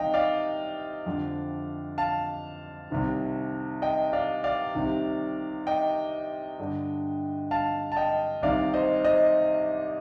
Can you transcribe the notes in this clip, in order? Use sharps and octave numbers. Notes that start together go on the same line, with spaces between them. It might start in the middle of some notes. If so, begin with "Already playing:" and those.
Already playing: C2 C3 D#3 D#5 F5 G5
D5 F5
F2 D3
F5 A5
C2 C3 D#3
D#5 G5
D5 F5
D5 F5
C2 C3 D#3
D#5 G5
G2 D3
F5 A5
A5
D#5 G5
C2 C3 D#3 D5 F5
C5 D#5
C5 D#5